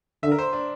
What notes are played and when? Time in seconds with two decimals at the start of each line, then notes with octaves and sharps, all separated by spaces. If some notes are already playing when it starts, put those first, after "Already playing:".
0.23 D3 E5
0.32 A#4
0.39 C5
0.53 D4